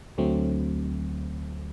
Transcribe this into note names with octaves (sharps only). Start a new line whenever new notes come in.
D2 D3 F#3 A3 C4